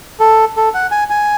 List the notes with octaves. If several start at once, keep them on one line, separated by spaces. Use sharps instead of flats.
A4
A4
F#5
G#5
G#5